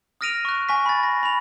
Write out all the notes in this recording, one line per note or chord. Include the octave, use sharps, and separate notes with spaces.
D#6 F6 A#6 D7 D#7 F7
C#6 F#6
G#5 C#6 B6
B5 A6
A#6
B5 F7